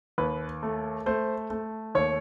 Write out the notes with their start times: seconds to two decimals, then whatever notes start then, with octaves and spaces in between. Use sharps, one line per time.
0.18 D#2 B4
0.63 A3
1.06 A3 C5
1.50 A3
1.95 D#2 C#5